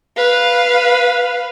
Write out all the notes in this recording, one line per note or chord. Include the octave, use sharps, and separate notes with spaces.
B4 F5